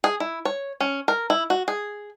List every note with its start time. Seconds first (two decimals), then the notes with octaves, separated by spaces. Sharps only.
0.04 G#4
0.20 E4
0.45 C#5
0.80 C#4
1.08 A#4
1.30 E4
1.50 F#4
1.68 G#4